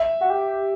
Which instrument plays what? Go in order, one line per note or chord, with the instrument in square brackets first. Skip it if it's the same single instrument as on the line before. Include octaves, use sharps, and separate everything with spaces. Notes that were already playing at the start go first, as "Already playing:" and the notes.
Already playing: [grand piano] E5
[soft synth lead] F#4
G4